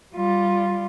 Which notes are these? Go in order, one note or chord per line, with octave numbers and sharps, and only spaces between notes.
G3 F4